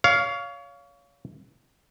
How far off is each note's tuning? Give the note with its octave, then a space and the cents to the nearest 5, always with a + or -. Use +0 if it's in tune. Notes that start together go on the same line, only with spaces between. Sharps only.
C#5 +30 F5 +0